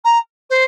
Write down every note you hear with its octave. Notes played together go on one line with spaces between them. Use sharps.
A#5
C5